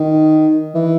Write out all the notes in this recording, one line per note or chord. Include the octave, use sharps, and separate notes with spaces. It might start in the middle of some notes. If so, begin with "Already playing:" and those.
Already playing: D#3
E3